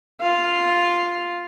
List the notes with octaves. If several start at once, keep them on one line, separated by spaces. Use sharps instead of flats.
F4 F5